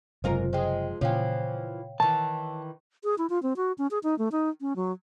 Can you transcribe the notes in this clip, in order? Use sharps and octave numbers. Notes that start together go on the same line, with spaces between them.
F#1 G#2 C3 F#3 F4 A#4 C5
F3 G#3 C5 D#5 G5
A#2 C#3 E3 F3 C#5 F5 G5
D#3 E3 A5
G#4
E4
F4
C4
F#4
C#4
G#4
D#4
A3
D#4
C#4
F#3